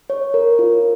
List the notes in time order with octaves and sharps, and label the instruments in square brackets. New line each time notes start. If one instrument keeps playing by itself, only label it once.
[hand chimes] C#5
A#4
F4